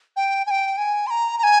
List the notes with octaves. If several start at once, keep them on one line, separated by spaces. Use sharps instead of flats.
G5
G#5
G5
G#5
C6
A#5
A#5
G#5